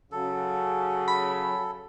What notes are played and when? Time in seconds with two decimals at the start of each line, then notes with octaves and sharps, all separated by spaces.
0.12 C#3 F#3 A4
1.08 B5